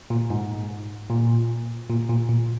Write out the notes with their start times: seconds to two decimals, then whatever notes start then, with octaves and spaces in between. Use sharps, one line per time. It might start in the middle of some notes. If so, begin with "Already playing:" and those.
0.10 A#2
0.30 G#2
1.10 A#2
1.89 A#2
2.10 A#2
2.29 A#2